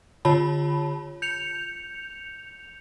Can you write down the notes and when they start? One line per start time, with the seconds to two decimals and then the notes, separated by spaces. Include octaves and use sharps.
0.25 D3 F4 C#5 A5 B5
1.22 G6 C#7 F7